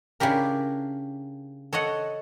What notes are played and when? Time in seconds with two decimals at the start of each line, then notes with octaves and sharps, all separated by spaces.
0.20 C#3 D4 E4 G4 A#4
1.73 A4 C#5 D#5 F#5